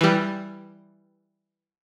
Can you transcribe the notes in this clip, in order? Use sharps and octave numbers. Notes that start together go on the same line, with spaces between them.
E3 G3